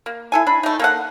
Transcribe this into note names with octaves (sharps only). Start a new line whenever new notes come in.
A#3
E4 A4 G#5
D4 B5
A3 D#4
A#3 A4 F#5